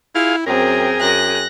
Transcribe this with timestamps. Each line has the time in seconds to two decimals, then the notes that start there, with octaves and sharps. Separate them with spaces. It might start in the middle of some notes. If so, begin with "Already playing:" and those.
0.15 E4 F4 G#4 F5
0.46 F#2 C4 G#4 A#4 G5
1.00 F#2 F#6 A#6